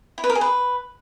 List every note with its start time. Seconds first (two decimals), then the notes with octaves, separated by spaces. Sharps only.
0.18 E4
0.24 B4
0.30 A#4
0.35 G#4
0.41 B4